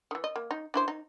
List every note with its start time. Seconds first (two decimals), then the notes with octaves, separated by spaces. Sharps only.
0.11 D#3 E3
0.24 D#5
0.36 A#3
0.51 D#4
0.74 D4 E4 C5
0.88 D#4